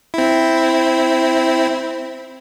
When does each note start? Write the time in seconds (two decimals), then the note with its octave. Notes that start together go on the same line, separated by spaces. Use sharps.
0.14 C4 E4